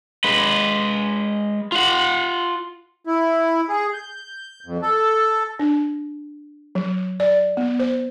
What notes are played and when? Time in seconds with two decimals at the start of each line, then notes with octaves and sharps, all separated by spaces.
0.24 G#3 B4
1.72 F4 F#5
3.07 E4
3.69 G#4
3.93 G6
4.66 F2
4.82 A4
5.59 D4
6.75 F#3
7.20 D5
7.57 B3
7.79 C5